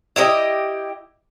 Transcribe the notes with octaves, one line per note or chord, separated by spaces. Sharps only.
E4 G4 C5 D#5